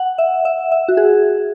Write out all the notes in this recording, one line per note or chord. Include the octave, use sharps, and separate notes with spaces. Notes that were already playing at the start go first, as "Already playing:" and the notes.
Already playing: F#5
E5
E5
E5
F#4
G#4